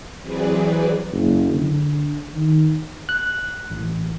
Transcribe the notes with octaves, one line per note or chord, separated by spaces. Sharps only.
E3 F#3 C4 G#4 B4 D5
F#1
D3
D#3
F#6
A1